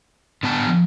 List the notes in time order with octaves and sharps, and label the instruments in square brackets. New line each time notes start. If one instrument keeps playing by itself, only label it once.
[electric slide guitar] D3 B3 A5
[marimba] F3